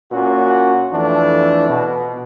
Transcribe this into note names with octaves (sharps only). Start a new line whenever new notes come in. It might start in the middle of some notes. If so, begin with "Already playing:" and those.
A#2 C#4 F#4
F2 E3 A3 D4
B2